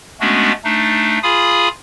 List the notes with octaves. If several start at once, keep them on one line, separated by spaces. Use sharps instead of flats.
G#3 A3 B3 C#4 D4 F#4
A3 D4 D#4
F4 G#4 F5 G#5 B5 D#6